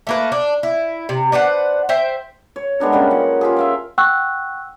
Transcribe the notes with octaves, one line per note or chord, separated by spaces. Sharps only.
A3 A#3 B4
D4
E4
C3
D4 B4 C5 F#5
C5 E5 G5
C#5
G#3 B3 D4 A#4
G3 A#3 C#4 G#4
F3 F#5
F4 G4 G#4
E5 F5 G5
F#5 G5 C#6 E6 F#6